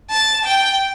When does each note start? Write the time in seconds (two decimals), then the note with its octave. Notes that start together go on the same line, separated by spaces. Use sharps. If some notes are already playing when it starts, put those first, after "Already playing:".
0.10 A5
0.45 G5